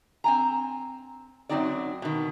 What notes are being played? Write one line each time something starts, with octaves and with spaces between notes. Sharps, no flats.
C4 G#5 A#5
F#2 C3 F#3 C4 D#4 D5
B2 D#3